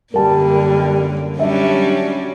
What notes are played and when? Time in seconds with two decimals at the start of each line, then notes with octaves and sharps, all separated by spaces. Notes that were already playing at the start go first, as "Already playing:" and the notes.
0.14 F#2 D3 G3 A#3 A#4 A5
1.39 F#3 G3 C#4 D4 E5